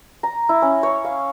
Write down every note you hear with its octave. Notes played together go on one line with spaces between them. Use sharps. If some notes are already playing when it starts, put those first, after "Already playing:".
A#5
E4
C#4
C#5
F5